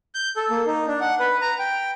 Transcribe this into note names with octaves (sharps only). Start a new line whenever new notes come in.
G6
A4
A#3
D#4
D4
F#5
B4
A#5
G5